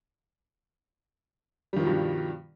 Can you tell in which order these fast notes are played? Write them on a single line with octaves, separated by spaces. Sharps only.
G3 D#3 F3 B2 G2